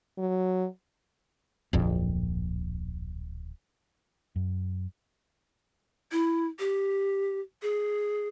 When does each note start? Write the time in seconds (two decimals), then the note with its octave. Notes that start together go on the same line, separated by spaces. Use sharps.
0.18 F#3
1.73 D1 A#1 F2
4.36 F#2
6.12 E4
6.59 G4
7.62 G#4